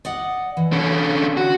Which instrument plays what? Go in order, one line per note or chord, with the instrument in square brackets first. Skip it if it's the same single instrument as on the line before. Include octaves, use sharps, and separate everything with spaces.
[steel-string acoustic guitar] D5 D#5 F#5
E3
[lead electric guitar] D3 C#4
F#4